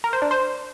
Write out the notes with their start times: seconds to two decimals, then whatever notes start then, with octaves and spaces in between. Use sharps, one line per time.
0.04 A#4
0.13 C5
0.22 D4
0.31 C5